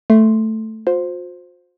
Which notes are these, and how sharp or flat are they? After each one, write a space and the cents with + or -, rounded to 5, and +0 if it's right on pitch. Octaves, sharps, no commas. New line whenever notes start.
A3 +0 C6 +0
F4 +45 C5 +0